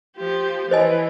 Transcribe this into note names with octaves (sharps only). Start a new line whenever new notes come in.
F3 G4
E3 C5 D#5 G#5